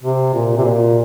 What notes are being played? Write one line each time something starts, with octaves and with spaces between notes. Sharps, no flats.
C3
A#2
C3
A#2